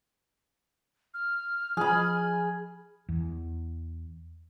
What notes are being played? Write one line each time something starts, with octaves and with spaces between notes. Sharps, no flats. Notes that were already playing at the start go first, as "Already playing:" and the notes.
F6
F3 G#4 B5
E2